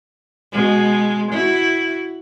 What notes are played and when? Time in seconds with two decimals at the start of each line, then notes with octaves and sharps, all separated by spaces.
0.52 B2 G#3
1.31 E4 F#4